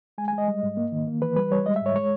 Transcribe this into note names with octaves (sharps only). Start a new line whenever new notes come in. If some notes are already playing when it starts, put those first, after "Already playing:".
G#3 G#5
G#5
G#3
D#5
G3
G#2
A#3
D#3
A#3
E3 B4
G3 B4
G3 C#5
G#3 D#5
E5
G#2 C#5
G#3 C#5